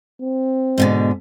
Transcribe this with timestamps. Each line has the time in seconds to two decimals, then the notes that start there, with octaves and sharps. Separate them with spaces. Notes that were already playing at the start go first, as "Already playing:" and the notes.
0.21 C4
0.78 G#2 B2 D3